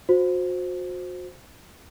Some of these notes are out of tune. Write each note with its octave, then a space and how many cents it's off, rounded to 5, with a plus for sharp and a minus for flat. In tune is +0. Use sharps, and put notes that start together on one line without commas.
F#4 -30 C5 +0